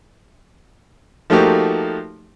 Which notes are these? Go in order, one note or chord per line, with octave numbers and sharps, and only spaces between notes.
F3 A3 A#3 D#4 F#4 G4